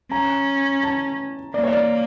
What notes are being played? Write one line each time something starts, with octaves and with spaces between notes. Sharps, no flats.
C#4 A#5
A5
A#3 D5
C#5
D5